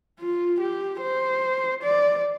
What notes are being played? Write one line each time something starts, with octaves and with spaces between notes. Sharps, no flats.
F4
G4
C5
D5